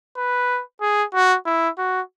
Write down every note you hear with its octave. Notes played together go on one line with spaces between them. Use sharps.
B4
G#4
F#4
E4
F#4